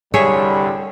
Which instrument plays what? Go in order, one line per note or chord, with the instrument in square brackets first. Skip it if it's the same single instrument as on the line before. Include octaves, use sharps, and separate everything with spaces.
[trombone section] C2 D3 G3 [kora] G#4 C#5 E5